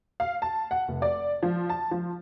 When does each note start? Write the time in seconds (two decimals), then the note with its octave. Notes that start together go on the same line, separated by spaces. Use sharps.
0.20 F5
0.42 A5
0.71 F#5
0.88 F1
1.02 D5
1.43 F3
1.69 A5
1.91 F3